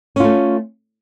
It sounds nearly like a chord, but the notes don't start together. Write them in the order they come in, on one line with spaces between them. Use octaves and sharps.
C#4 F4 A3